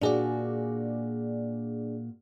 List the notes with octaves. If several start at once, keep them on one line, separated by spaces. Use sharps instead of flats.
A#2 D4 F#4 G#4 D5